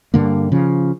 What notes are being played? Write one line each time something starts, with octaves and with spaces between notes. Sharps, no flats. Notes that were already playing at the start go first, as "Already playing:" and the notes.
G2 D3 A#3
C#3 F3